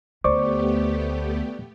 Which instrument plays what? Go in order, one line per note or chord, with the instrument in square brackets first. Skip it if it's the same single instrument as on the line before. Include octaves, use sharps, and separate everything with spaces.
[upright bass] D2 [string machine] A3 B3 G4 [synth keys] C5 [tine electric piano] D5 C#6 D6